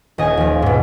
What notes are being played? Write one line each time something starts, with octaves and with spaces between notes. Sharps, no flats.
D#1 D#5 G#5
D#2 F3
G#2 B2